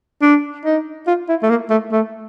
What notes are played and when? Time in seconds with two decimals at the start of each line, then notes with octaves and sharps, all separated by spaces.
0.22 D4
0.65 D#4
1.07 F4
1.29 E4
1.43 A3
1.50 A#3
1.70 A3
1.92 A3